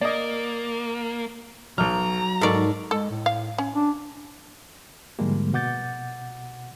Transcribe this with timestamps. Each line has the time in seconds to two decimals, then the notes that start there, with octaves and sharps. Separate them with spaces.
0.01 A#3 D5 D#5
1.78 B1 F#3 A#5 F6
2.41 G#2 A4 A#4 D5 C#6
2.91 G#3 A4
3.10 A2
3.26 F5
3.58 C#4
3.75 D4
5.19 G#2 D3 F3 G3 G#3 A#3
5.54 B2 F#5 D6 G6 A6